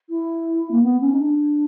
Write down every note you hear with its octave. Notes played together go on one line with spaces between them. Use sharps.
E4
A#3
B3
C#4
D#4
D4